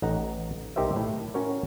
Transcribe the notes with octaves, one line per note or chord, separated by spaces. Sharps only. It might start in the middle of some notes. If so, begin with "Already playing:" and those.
A1 D#4 F#5 A#5
B1 D#4 G4 A#4 C5 E5
A2
C#4 F#4 A#4 C#5